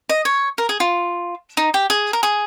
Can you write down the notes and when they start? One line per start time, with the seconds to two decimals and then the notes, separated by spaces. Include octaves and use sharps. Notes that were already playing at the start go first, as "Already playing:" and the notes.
0.09 D#5
0.25 C#5
0.58 A#4
0.69 G#4
0.80 F4
1.57 D#4
1.74 G4
1.90 G#4
2.13 A#4
2.23 G#4